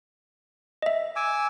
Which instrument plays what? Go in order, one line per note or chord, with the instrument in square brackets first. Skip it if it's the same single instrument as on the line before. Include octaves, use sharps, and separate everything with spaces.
[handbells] D#5 E5
[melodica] G#5 D6 E6